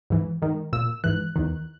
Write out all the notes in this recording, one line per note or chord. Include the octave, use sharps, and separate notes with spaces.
G#2 E3
G#2 D#3
A#2 E6
G#2 E3 F#6
E2 D#3